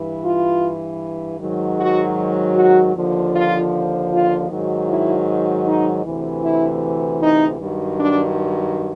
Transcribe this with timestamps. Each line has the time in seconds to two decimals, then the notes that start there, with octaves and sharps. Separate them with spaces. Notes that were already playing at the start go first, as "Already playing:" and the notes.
Already playing: G2 E3
0.24 F4
1.40 G#2 D#3 F#3
1.78 F#4
2.56 F#4
2.95 D#2 D3 F3
3.34 F4
4.11 F4
4.49 G#2 D#3 F#3
4.88 E4
5.66 D#4
6.04 D2 C3 E3
6.43 E4
7.21 D#4
7.59 G2 D#3 F#3
7.99 D4